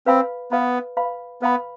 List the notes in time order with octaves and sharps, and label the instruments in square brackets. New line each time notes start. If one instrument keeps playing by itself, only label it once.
[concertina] C4 [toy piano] B4 F5 B5
[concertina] B3 [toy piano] B4 F5 B5
[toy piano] B4 F5 B5
[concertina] B3 [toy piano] B4 F5 B5